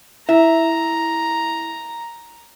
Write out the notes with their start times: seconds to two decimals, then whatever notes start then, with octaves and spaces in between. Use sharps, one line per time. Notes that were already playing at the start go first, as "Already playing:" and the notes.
0.29 E4 E5 A#5